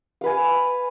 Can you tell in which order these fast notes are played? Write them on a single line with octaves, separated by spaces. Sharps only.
F5 B4 G#5